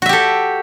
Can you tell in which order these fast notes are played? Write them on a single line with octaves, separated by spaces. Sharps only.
F#4 E5 G4 A4